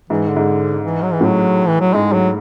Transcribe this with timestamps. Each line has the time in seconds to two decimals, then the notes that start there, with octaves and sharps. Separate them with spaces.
0.10 G#2 E3
0.28 D3
0.36 G#2
0.83 E3
1.02 F#3
1.13 E3
1.21 A2 F#3
1.67 E3
1.80 F#3
1.94 G#2 G#3
2.13 F#3